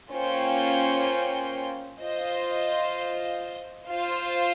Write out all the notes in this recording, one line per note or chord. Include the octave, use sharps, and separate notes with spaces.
A#3 C#4 F4 C5 G5
F4 C5 D#5
F4 C5 F5